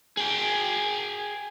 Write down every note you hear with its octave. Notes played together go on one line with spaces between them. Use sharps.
G#4 G5